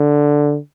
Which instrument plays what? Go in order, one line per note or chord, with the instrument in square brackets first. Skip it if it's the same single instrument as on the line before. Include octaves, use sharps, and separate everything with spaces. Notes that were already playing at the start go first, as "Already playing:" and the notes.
Already playing: [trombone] D3